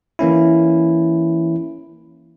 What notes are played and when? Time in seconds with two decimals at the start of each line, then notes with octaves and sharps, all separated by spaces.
0.19 E3 A#3 C#4 E4